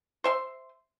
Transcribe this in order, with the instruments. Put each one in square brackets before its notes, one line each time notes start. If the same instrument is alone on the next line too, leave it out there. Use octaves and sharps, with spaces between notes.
[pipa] C5 E5 C6